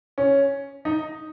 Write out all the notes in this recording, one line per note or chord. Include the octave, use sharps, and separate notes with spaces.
C#4
D#4